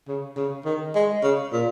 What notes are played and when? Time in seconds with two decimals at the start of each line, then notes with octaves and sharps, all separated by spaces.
0.08 C#3
0.37 C#3
0.65 D#3
0.95 G#3
1.23 C#3
1.53 A#2